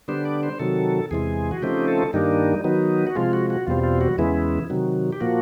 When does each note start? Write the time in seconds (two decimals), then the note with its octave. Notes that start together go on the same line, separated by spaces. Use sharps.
0.08 D3 G3 B3 D4 C5
0.25 D5
0.43 C5
0.60 C3 D#3 F#3 A4
1.11 E2 C3 E3 G#3 G#4
1.51 F#4
1.62 C#3 F3 A3 C4 D#4 G4
1.88 A4
2.13 G2 D#3 G3 A#3 D4 D#4
2.64 D#3 F#3 B3 D#4
3.07 F#4
3.15 C3 F3 G#3 F4
3.33 F#4
3.50 F#4
3.67 E2 B2 G3 C4 F4
3.84 F4
4.01 F#4
4.18 E2 C#3 E3 G#3 B3 E4
4.70 C3 D#3 F#3
5.13 G4
5.21 A#2 F3 A#3 F#4